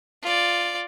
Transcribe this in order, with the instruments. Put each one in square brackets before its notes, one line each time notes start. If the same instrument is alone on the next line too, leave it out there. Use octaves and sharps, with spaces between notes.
[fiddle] F4 D5